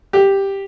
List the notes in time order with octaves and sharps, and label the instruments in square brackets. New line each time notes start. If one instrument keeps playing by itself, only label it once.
[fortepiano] G4